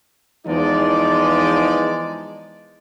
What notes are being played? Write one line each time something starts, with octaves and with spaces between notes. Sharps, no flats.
E2 E3 F3 G#3 D#4 D5